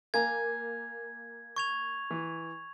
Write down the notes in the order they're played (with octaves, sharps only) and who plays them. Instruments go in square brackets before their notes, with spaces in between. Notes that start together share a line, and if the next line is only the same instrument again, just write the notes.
[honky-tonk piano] A#3 [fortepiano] F5 G#5 A#5 [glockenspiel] G#6
[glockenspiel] C#6 G#6 F7
[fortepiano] E3